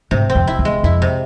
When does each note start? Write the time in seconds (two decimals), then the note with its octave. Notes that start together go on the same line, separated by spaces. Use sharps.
0.11 G#2 C3
0.30 C4
0.35 F2
0.47 E4
0.59 E2
0.65 G#3
0.83 F2 E4
1.02 C3